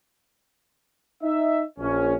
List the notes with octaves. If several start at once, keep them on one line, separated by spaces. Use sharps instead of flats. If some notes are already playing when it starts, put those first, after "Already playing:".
D#4 E5
A#1 C#4